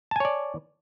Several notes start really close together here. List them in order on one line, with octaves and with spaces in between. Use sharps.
A5 G#5 C#5 D5